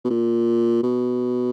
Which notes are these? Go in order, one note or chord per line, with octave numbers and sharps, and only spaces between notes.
B2
A#2
B2